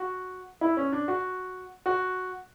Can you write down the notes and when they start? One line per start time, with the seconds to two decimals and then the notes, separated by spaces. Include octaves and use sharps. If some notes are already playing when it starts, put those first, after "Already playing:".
Already playing: F#4
0.61 E4
0.77 C#4
0.92 D4
1.08 F#4
1.86 F#4